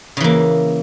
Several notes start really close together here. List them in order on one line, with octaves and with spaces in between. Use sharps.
C#3 E3 A#3